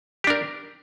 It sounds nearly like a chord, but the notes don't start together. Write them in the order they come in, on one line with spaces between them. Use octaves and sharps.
G4 D4 A#4